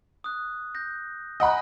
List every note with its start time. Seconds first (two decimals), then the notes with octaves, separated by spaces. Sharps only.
0.24 D#6 F#6
0.75 G6 A#6
1.40 D#5 F#5 G#5 B5